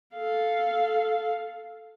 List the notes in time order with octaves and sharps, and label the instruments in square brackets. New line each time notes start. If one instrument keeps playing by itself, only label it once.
[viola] A4 F5